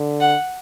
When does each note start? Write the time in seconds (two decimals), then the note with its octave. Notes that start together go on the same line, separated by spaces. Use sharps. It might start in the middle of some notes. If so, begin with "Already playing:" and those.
Already playing: D3
0.21 F#5